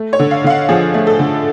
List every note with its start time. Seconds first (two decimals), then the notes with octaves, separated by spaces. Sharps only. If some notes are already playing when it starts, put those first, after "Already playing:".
Already playing: A3
0.13 C#5
0.19 D3
0.31 F5
0.44 D3 F5
0.50 F#5
0.69 F3 G#4
0.94 A3
1.07 A4
1.19 D3